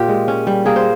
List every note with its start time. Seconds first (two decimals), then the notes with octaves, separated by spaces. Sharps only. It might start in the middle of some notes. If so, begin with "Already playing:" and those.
Already playing: A#2 F4 G4
0.08 G#3
0.28 C#4
0.47 G3
0.66 A#3 G#4
0.76 C5